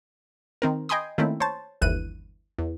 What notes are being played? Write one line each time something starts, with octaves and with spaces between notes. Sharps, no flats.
D#3 C4 A#4
D#5 G5 G#5 B5 C6 D#6
D#3 A3 A#3 C4 C#4 E4
C5 C#5 A5
G1 D#2 E3 F#6 D#7
E2